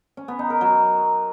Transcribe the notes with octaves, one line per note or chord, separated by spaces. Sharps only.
C#4
B3
D#4
A#4
F#3